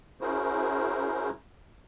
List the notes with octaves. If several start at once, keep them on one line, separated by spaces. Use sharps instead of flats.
C#4 E4 F#4 G#4 A#4 C5